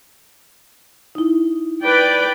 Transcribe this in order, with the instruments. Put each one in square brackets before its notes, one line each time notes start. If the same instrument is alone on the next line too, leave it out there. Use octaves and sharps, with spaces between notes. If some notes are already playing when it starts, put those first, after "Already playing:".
[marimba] D#4 E4
[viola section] B4 D5 G5